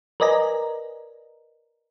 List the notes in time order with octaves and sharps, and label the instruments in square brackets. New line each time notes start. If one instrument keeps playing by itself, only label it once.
[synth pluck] A#4 B4 D5 D#5 G#5 A#5